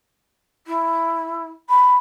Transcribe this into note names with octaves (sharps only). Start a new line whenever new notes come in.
E4
B5